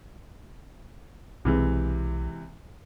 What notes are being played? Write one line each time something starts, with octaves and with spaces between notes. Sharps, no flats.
B1 C3 E3 G#3